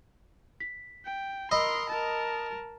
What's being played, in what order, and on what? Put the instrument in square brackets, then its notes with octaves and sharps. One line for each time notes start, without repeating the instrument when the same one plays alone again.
[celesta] B6
[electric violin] G5
[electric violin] A#4 C6 [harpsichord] D#5 [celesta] B5 E6
[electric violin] A#4 A5